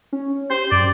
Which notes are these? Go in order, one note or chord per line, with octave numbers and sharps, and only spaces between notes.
C#4
G4 C5
F#2 D5 D6